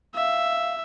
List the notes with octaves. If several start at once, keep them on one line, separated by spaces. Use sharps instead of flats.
E5 F5